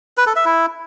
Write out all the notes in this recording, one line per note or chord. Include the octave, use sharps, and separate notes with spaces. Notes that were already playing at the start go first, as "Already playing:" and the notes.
B4
A4
E5
E4